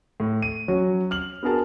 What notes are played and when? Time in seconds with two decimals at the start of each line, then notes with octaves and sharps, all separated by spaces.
0.20 A2
0.42 D#7
0.68 F#3 C#4 F#4
1.11 F6 F#7
1.43 B3 D4 F#4 G#4 A#4 A5